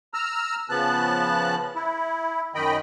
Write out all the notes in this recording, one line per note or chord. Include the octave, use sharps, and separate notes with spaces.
A#5 E6 F6
C#3 F3 B3 A5 F#6
E4
F#2 D#3 D#5 G5 B5